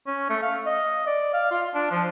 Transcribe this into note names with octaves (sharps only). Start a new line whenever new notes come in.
C#4
A3
F5
D#5
D5
F5
F4
D4
F3